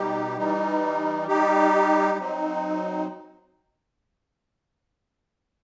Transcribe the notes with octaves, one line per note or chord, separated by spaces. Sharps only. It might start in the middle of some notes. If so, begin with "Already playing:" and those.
Already playing: B2 G3 D#4 G4
E3 G3 D#4
G3 D#4 G4
F#3 C4 D#4